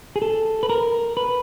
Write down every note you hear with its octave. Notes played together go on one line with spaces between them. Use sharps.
G#4
A4
B4
A#4
B4